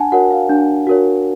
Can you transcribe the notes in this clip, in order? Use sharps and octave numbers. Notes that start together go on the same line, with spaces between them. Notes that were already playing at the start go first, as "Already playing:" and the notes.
Already playing: D4 F#5 G#5 A5
F#4 A#4 C#5 F#5
F5
D4
F#4 A#4 C#5